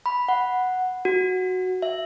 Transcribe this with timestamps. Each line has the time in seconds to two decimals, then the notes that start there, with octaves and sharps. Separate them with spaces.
0.06 B5
0.28 F#5
1.05 F#4
1.82 E5